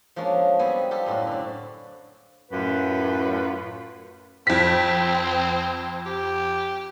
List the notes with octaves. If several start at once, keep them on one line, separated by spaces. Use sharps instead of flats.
F3 G#3 A#3 C#4 D4
G3 B3 C4 G#5
B3 F4 G4 A4
F#2 A2 C4 F#4
D3 D5
F#2 A2 F4 F#4 B4
F2 C4 B6
G4